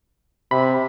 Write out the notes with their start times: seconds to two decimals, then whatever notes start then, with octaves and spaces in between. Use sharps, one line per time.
0.51 C3 B5